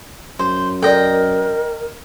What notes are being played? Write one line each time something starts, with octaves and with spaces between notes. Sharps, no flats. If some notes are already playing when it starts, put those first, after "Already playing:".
F#2 C5
A4 A#4 D5 D#5 G5